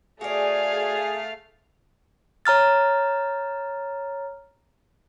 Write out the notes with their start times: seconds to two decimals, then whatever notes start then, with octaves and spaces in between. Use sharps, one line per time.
0.21 A3 F#4 G#4 D5 F5
2.45 C#5 A#5 F6 A6